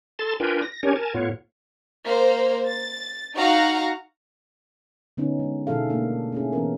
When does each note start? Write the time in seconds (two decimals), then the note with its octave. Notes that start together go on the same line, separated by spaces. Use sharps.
0.19 A4 A5 C6 A6
0.40 D4 F4 A#4 B4 G5 G#5
0.62 A#6
0.83 C#4 D4 G4 A#4 C#5 G#5
0.96 A#4 G#5 A5
1.14 A2 B3 F4 C#5
2.05 A#3 C5
2.66 A6
3.35 D#4 F#4 F5 F#5 A#5
5.17 D3 B3 C#4 D#4
5.39 G#3
5.67 B2 D#3 E4 G#4 A4 F5
5.89 A3 A#3 D4
6.32 C#4 E4 G#4
6.52 E3 B3 C#4 A#4